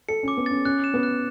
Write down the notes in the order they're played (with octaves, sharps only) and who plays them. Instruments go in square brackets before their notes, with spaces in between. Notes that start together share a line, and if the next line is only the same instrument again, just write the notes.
[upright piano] A4 [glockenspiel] C#7
[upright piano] C#4 [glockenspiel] D6
[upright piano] B3
[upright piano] C#4 [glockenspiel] A6
[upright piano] C#4 [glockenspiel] F#6
[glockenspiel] E7
[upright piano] B3
[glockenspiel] F#6